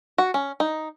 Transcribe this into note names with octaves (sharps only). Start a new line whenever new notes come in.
F#4
C#4
D#4